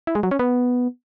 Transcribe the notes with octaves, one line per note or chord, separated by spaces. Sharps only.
E4
G#3
F#3
C#4
B3